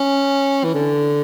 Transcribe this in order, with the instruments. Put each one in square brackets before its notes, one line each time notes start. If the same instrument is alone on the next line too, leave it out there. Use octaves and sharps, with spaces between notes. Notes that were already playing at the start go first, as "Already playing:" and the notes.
Already playing: [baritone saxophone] C#4
E3
D3